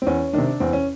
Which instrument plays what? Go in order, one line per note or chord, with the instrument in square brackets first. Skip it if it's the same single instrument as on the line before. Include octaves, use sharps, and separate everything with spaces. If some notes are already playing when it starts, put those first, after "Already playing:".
[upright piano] C4
E2 C#4
C3 D#3 D4
E2 C4
C#4